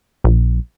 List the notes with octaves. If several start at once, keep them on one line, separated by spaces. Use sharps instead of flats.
A#1